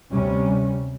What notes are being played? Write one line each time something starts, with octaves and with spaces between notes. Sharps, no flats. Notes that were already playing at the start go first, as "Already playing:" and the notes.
D2 C3 G3 C#4